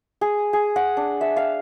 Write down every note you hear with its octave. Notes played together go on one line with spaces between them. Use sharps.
G#4
G#4
F#5
D4
E5
F5